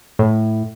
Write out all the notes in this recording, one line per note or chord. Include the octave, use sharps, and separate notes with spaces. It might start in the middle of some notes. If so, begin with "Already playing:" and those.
A2